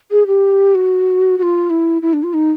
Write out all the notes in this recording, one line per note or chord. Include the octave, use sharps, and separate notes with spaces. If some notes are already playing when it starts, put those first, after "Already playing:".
G#4
G4
F#4
F#4
F4
E4
E4
D4
F4
D#4